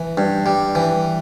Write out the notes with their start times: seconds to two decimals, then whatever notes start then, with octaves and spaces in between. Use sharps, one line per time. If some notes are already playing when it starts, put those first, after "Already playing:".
Already playing: E3
0.17 G2
0.46 G3
0.75 E3